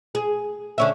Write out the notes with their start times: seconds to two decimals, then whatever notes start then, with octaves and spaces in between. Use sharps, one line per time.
0.15 G#4
0.78 D3 C#4 E5